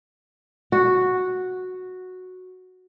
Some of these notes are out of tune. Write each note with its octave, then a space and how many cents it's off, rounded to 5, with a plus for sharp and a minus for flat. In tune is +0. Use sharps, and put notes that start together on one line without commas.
F#4 -5